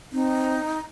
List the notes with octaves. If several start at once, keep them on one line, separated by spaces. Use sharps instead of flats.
C4 D#4